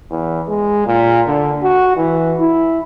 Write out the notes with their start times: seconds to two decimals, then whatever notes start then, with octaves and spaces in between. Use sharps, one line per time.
0.11 E2
0.48 G#3
0.87 A#2
1.27 D3
1.63 F#4
1.96 E3
2.40 E4